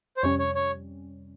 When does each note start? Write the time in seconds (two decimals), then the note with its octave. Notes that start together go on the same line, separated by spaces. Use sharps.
0.17 C5
0.23 F2 C3 G3 C#4 C#5
0.39 C#5
0.55 C#5